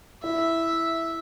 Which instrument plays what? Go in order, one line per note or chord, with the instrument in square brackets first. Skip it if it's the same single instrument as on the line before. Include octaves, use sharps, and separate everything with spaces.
[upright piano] E4 [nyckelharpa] E5